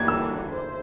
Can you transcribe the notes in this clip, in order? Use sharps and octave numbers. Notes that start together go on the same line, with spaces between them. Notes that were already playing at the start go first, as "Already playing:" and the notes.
Already playing: E3 G3 A#3 D4 F#4 G#6
E6
C5